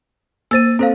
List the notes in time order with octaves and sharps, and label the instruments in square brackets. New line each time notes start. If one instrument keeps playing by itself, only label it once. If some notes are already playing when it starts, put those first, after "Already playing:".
[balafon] A#3 C5 [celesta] E6 A6 D#7
[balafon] C4 [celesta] A4 C5 F5